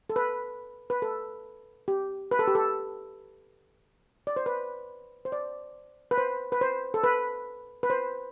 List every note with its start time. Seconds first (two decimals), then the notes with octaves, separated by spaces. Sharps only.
0.10 A4
0.16 B4
0.90 B4
1.02 A4
1.88 G4
2.31 B4
2.39 A4
2.48 G4
2.55 A4
4.27 D5
4.36 C5
4.46 B4
5.25 C5
5.32 D5
6.11 B4
6.18 C5
6.52 B4
6.61 C5
6.94 A4
7.03 B4
7.83 B4
7.90 C5